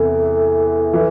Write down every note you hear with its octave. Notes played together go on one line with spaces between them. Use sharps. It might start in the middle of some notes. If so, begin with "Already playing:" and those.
Already playing: E2 C3 E3 A4
E3